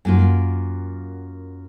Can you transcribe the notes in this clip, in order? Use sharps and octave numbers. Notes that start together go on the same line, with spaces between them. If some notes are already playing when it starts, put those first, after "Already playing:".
F#2 A#3 F4